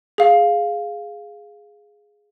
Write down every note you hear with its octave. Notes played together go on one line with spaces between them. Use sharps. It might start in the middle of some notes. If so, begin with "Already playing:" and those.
G#4 F5